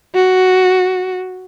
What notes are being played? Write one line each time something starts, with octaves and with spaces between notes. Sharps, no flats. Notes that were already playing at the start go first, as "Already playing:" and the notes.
F#4